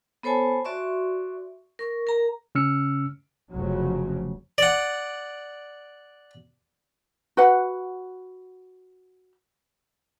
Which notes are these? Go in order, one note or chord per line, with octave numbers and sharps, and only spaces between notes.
B3 A4 C5 C#5 G#5 A5
F#4 D5 E5 C6 C#6
A#4 C#6
A#4 A#5
C#3 C#4 E6 F6 C#7
F1 C#3 F#3
D5 F#5
F#4 B4 F#5